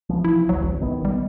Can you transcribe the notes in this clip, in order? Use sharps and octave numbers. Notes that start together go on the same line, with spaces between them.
C2 E3 F3
E4
G#1 D2 F#3
A1
B1 D#3 B3
G3